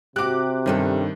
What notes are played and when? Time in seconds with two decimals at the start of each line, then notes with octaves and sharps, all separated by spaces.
0.16 C3 F#4 G4 D6 F#6
0.66 G2 D#3 G3 C#4 A4